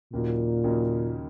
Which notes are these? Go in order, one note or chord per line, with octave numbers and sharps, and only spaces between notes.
D#2 A#2 C#3 F#3 A#3 D#4
D#2 C#3 F#3 A#3 D#4